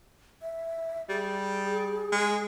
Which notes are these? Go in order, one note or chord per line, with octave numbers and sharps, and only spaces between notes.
E5
G3 G#4
G#3